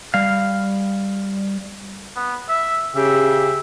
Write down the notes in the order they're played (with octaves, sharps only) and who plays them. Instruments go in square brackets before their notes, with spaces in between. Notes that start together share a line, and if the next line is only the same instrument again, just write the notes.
[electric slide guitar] G3 F5
[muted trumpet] B3
E5
[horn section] C#3 G4 [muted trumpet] E5